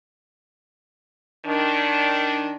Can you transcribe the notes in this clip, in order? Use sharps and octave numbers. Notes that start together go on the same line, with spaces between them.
D#3 D4